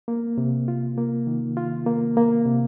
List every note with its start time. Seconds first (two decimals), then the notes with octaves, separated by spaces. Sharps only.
0.08 A#3
0.38 C3
0.68 F4
0.97 A#3
1.27 D#3
1.57 F4
1.87 A#3
2.17 A#3
2.46 C3